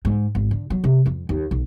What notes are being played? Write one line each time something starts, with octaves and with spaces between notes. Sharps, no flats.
G#2
G#1
D3
F#3
C3
F2
D#2
B1